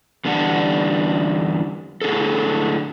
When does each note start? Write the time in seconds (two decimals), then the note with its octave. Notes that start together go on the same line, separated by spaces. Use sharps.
0.25 E2 D3 G3 D4 F#5
2.01 A2 D3 G#4 A4